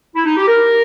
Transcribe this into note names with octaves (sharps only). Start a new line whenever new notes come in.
E4
D#4
G4
A#4